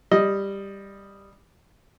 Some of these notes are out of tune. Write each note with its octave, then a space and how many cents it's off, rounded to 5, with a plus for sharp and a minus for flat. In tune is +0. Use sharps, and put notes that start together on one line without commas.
G3 +10 D#5 +0